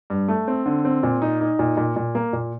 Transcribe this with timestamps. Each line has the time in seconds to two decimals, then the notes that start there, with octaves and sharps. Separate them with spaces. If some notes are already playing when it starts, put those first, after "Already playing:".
0.10 G2
0.28 A3
0.48 C4
0.66 D3
0.85 C4
1.03 A#2
1.22 D#4
1.41 D#4
1.59 A#2
1.77 A#2
1.96 A#2
2.15 A#3
2.33 A#2